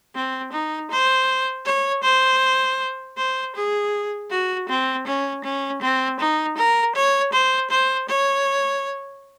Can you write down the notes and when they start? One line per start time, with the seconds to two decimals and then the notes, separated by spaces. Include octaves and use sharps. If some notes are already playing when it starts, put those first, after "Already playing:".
0.15 C4
0.52 D#4
0.91 C5
1.66 C#5
2.03 C5
3.17 C5
3.55 G#4
4.30 F#4
4.69 C4
5.07 C#4
5.44 C#4
5.82 C4
6.19 D#4
6.57 A#4
6.95 C#5
7.33 C5
7.70 C5
8.09 C#5